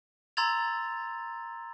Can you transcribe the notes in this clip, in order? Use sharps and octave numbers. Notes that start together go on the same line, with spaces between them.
A#5 C6 E6 G#6 A6 F7